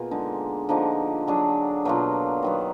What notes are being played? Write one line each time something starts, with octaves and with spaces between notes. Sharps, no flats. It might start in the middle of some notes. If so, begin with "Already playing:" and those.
Already playing: B2 A#3 F4 G#4
D3 G#3 D#4
D3 F3 A#3 D#4
F#3 D4 G#4
B2 F#3 A#3 F4
D#3 F#3 B3